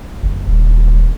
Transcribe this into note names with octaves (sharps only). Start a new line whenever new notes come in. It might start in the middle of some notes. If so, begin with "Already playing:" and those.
F#1
D#1